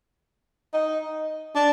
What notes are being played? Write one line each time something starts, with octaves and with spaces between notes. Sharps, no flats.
D#4
D4